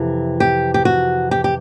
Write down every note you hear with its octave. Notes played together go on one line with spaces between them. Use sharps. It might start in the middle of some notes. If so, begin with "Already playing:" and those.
Already playing: F2 C3 E3
G4
G4
F#4
G4
G4